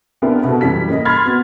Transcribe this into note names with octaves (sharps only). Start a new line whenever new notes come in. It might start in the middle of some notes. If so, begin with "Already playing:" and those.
B3 C4 D4 E4 G4 A#4
B2 B3 F#4 A4
F#2 E3 G3 B6
A#3 C#4 D#5
B5 C6 F6 G#6 A6
B3 F#4